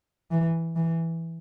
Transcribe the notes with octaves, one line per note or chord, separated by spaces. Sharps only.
E3
E3